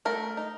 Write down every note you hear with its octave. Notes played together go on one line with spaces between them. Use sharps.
A3 A#4
D#4